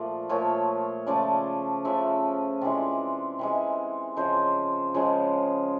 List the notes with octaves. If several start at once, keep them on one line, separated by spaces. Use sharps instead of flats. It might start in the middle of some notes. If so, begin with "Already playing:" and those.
Already playing: A#2 F3 A3 D5
A#2 F3 A3 C#5
C#3 F3 A3 D5
C#3 F3 A3 E5
C3 E3 G#3 D5
C3 E3 G#3
C#3 F3 G#3 C5
C#3 F3 G#3